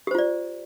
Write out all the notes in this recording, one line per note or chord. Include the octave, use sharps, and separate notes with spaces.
F4 G4 C5 D5